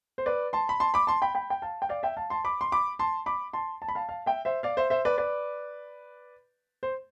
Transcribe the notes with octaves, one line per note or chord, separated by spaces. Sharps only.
C5
B4 D5
A5 C6
B5
A5 C6
B5 D6
A5 C6
G5 B5
G5 B5
G5
F5 A5
G5
D5 F5
E5 G5
F5 A5
A5 C6
B5 D6
C6
B5 D6
A5 C6
B5 D6
A5 C6
A5
B5
F5 A5
F5 A5
E5 G5
C5 E5
D5 F5
C5 E5
C5 E5
B4 D5
B4 D5
C5